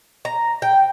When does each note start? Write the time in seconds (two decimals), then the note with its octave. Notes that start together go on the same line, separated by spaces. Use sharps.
0.25 A#5
0.62 G5